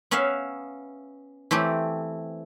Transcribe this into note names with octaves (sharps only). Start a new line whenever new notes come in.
B3 C#4 B4 E5 F5
E3 A3 C4 G4